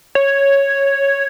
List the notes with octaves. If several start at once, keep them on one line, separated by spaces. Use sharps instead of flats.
C#5